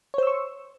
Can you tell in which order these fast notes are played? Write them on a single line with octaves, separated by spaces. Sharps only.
C#5 C5 E6 C#6